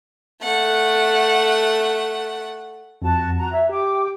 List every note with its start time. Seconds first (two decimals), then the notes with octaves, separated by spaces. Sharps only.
0.42 A3 F#5
3.02 F2 F#4 A5
3.38 F#4 A#5
3.52 C#5 E5
3.69 G4 G5 D6